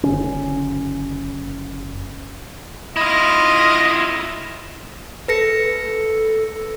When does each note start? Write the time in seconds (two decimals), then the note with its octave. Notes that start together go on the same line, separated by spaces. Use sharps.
0.03 F#1 D3 C#4
2.96 E4 F4 D#5
5.28 A4 B4 A#6 C#7